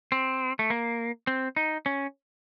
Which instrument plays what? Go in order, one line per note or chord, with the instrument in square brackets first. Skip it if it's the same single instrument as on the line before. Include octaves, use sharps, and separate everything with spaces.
[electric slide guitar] C4
A3
A#3
C4
D#4
C#4